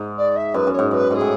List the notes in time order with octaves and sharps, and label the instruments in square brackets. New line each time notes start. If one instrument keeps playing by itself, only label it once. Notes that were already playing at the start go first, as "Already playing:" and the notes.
Already playing: [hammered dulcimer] G#2
[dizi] D5
E5
[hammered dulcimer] F#2 [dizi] B4
[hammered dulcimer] F#2
[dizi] C#5
[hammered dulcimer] G#2
[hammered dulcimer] F#2 [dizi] B4
[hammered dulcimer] G#2 [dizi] G#4 B4
[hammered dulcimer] A2